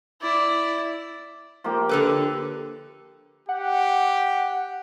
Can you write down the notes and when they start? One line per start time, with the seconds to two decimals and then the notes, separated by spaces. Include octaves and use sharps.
0.22 E4 D5
1.64 F3 A#3 G4
1.89 D3 A4 B4
3.49 G4 F#5